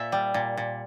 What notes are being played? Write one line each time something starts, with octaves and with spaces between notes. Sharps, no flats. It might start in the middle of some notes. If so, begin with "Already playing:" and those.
Already playing: A#2 E5
G3
A#2
A#2